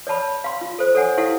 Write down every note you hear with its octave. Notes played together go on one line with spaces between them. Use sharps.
C#5 D5 A5 B5
F5 C6
F4
A4 C5
A4 C#5 F#5 G#5
E4 G4 A4 F5 F#5